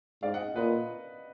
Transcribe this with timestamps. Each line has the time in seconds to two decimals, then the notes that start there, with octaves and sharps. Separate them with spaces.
0.23 G#2 D5 F5
0.34 D#5 F#5
0.55 A#2 B4 D#5